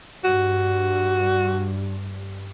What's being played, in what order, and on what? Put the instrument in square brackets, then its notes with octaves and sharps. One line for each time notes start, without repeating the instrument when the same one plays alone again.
[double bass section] G2 [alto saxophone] F#4